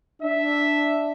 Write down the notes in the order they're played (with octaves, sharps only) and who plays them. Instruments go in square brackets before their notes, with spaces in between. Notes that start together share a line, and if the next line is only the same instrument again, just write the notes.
[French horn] D4 [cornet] E5